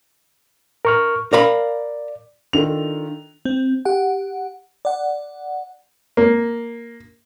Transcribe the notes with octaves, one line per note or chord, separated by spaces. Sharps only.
A#4 C#6 F6
A#4 D5 F5 B5
D#3 D4 F4 A4 F7
C4
G4 F#5
D5 F#5
A#3